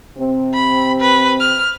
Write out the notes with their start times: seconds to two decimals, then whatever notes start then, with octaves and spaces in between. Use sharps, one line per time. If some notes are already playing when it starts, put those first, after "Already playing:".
0.18 C3 C4
0.54 B5
1.00 B4
1.40 F6